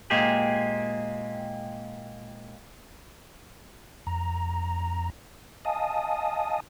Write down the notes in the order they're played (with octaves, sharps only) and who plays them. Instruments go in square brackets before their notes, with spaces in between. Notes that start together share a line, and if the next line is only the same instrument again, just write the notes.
[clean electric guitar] A#2 G#3 A#3 C4 G4 G#4
[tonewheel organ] F2 A#5
D#5 F5 G#5 A5 D#6